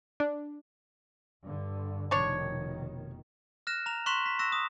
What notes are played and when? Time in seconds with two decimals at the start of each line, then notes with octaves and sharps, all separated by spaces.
0.20 D4
1.43 G2 D3
2.11 F1 B2 D#3 D4 C#5
3.67 F6 F#6 A#6 E7
3.86 A#5 F7
4.06 C6 C#6 F#6 B6 E7 F7
4.26 B6
4.39 C#6 E6 F#6 A#6 E7
4.52 D#6